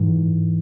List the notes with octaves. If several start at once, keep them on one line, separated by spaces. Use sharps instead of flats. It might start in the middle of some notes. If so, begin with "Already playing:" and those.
Already playing: G#2 E3